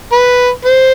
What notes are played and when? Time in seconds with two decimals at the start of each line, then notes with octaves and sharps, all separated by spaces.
0.12 B4
0.65 C5